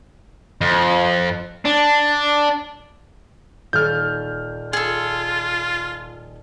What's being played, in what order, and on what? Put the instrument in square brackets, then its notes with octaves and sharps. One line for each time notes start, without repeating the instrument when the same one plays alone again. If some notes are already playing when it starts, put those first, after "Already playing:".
[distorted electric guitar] F2
D4
[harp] D#1 A6 [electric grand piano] F6 G6
[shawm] F4 [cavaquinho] G#4 A4